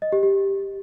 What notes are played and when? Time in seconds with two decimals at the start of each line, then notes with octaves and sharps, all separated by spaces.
0.02 D#5
0.12 G4
0.23 G4